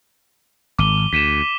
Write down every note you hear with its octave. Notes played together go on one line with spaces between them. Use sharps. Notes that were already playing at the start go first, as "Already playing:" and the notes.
G#1 D6 D#7 G7
D2 B6 D#7 E7